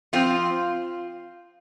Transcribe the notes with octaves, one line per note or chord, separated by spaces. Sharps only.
F3 C4 F4